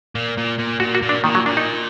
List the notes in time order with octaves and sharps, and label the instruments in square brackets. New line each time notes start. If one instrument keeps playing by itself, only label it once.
[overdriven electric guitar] A#2
A#2
A#2
[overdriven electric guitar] A#2 [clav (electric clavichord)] F#4
[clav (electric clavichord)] F#4
[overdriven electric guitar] A#2
[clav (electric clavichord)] D4
[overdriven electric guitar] A#2 [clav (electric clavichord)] D#3
[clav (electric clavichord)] F#3
[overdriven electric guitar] A#2 [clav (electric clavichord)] D4
[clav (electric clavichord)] D#4